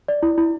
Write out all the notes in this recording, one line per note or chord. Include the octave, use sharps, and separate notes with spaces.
D5
E4
E4